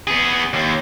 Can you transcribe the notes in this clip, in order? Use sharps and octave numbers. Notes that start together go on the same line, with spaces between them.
B3 G#4
D#2